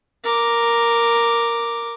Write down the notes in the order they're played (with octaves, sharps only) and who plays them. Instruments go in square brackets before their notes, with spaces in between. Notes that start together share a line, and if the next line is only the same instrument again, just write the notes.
[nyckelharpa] A#4 D6